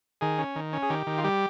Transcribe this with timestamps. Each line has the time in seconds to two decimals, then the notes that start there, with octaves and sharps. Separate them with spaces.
0.21 D#3 G#4
0.38 C#4
0.56 D#3
0.73 C#4
0.83 G#4
0.90 D#3 G4
1.07 D#3
1.18 F4
1.24 G3 G4